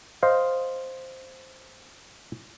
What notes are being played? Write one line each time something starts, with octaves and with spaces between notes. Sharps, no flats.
C5 D#5 F5